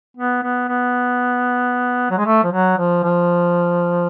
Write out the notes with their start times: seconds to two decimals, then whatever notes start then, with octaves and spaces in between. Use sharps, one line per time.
0.17 B3
0.43 B3
0.69 B3
2.10 F#3
2.18 G#3
2.25 A3
2.44 F3
2.52 F#3
2.78 F3
3.03 F3